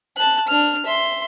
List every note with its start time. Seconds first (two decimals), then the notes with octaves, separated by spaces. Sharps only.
0.17 A5 F#6
0.48 D4 F6
0.86 E5 C6